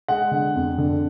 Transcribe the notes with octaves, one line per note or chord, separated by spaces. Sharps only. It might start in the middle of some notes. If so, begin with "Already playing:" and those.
G#3 F#5
D3
F2
D3